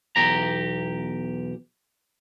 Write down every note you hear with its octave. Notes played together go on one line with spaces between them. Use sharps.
B1 E2 G4 A#5